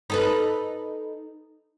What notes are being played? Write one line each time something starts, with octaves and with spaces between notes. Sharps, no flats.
D#4 A4 B4